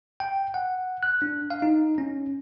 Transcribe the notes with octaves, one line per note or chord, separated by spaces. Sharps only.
G5
F#5
F#6
D4
F5
D#4
C#4